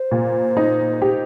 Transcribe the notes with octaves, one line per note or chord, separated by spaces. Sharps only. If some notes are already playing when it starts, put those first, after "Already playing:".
Already playing: C5
A#2
D#4
G4